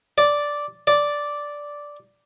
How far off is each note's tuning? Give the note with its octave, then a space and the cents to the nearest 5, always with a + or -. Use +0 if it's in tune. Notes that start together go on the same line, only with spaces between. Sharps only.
D5 -5
D5 -5